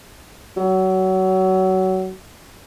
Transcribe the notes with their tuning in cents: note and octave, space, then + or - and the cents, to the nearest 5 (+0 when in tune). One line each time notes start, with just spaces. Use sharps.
F#3 +25